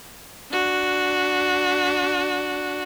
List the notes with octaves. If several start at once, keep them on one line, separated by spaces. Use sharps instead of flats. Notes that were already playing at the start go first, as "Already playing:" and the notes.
D4 F#4